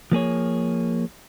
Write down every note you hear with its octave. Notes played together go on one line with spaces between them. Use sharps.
F3 A#3 G#4 C#5